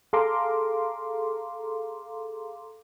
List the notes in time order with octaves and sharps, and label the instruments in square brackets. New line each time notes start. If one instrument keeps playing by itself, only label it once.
[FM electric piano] G#4 A4 F5 A#5 C6 D6